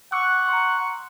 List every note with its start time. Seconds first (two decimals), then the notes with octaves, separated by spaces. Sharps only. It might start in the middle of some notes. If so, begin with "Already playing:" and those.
0.12 F#5 C#6 D6 E6 F#6
0.48 A#5 C6